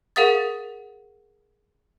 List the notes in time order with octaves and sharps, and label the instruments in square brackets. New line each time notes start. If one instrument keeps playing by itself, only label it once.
[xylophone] G#4 A#4 F5 F#5 D#6 A6